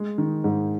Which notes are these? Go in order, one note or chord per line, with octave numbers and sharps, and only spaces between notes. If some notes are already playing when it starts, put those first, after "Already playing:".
Already playing: G#3
D#3
G#2